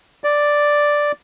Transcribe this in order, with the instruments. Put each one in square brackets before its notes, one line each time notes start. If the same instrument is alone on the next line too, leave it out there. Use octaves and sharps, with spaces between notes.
[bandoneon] D5